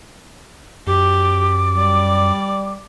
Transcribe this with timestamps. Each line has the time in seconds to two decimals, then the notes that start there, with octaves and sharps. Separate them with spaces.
0.87 F#2 G4 D6
1.77 G3 D5